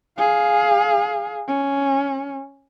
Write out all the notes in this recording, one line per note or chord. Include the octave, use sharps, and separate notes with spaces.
G#4 F5
C#4